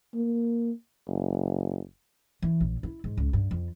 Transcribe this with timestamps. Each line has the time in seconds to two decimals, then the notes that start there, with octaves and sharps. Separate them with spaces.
0.14 A#3
1.07 F#1
2.42 E3
2.61 A#1
2.83 E4
3.04 G#2
3.17 C#2
3.33 G2
3.51 F2